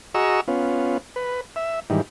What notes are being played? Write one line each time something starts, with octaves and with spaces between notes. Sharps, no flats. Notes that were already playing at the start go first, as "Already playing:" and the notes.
F#4 G#4 D#5 A#5 C#6 E6
B3 C#4 F4
B4
E5
G#2 D#3 E3 G3